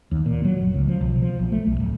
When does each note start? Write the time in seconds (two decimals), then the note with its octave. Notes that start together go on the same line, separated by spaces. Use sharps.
0.11 D#2
0.26 A#2
0.45 F#3
0.60 F#1
0.74 C#2
0.88 F3
1.01 B1
1.22 F3
1.39 A#1
1.52 A3
1.66 B1
1.80 D1